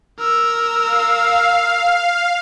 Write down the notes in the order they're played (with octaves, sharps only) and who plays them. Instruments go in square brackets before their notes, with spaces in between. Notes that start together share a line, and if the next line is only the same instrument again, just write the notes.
[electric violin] A#4 E6
[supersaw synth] F5